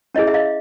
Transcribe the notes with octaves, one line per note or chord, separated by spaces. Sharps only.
C#4 E4 G#4 C#5 D#5
E5
D#5 F5